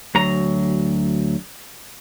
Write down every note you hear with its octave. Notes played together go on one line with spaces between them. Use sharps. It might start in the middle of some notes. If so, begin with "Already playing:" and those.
D2 F#3 A#5